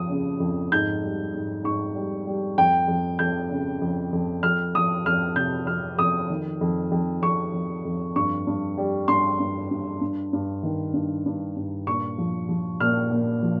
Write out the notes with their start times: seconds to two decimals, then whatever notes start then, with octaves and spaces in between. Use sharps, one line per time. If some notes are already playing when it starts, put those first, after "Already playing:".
Already playing: F2 F3 D#6
0.10 C#3
0.40 F2
0.72 G#2 G6
1.03 G3
1.34 G#2
1.64 G#2 C#6
1.96 G3
2.27 G3
2.58 F2 G5
2.88 F2
3.19 F2 G6
3.51 C#3
3.82 F2
4.13 F2
4.43 F2 F6
4.75 F3 D#6
5.05 F2 F6
5.36 C3 G6
5.67 F2 F6
5.98 F2 D#6
6.30 D#3
6.61 F2
6.92 F2
7.22 F2 C#6
7.54 F2
7.85 F2
8.16 G2 C#6
8.47 G2
8.77 G3
9.08 G2 C6
9.40 G2
9.71 G2
10.01 G2
10.33 G2
10.63 D#3
10.94 G2
11.26 G2
11.56 G2
11.87 A#2 C#6
12.18 F3
12.49 F3
12.80 A#2 F6
13.11 A#2
13.42 F3